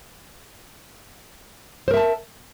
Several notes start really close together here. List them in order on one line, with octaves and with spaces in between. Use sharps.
C5 A#4 E5 A5